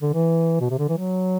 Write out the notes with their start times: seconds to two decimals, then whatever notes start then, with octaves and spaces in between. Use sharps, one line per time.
0.02 D3
0.14 E3
0.61 B2
0.71 C3
0.79 D3
0.89 E3
0.98 F#3